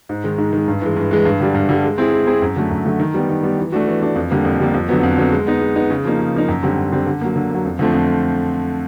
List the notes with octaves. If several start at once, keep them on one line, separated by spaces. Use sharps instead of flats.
G#2
D#3 G#3
G#2
D#3 G#3
G2
E3 G#3
G2
E3 G#3
G2
D3 G3
G2
D3 G3
G#3
C4 E4 G#4
G#3
C4 E4 G#4
F#2
D3 F#3 A3
F#2
D3 F#3 A3
D#3
G3 B3
D#3
G3 B3
E3
A3 D4 F#4
E3
A3 D4 F#4
F2
D3 G3 A#3
F2
D3 G3 A#3
F2
D3 F#3 B3
F2
D3 F#3 B3
G#3
B3 D#4
G#3
B3 D#4
C#3
F3 A#3 D#4
C#3
F3 A#3 D#4
F#2
D3 G3 C4
F#2
D3 G3 C4
D3
F#3 A#3
D3
F#3 A#3
F2
D3 F3 A3 C4
F2